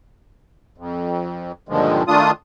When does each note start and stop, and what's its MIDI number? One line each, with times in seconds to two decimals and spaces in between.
0.78 1.52 41
1.69 2.03 43
1.69 2.03 46
1.69 2.03 50
1.69 2.03 51
1.69 2.03 53
1.69 2.03 56
2.08 2.31 51
2.08 2.31 57
2.08 2.31 62
2.08 2.31 65
2.08 2.31 87